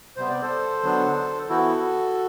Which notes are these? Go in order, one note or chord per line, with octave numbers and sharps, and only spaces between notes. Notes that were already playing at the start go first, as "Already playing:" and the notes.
C3 G3 B3 C5
D5
A4 C5
D3 F#3 B3 D4
E3 B3 E4 F#4 A4